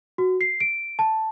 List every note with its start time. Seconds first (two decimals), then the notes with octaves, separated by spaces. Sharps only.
0.18 F#4
0.41 C7
0.60 D7
0.99 A5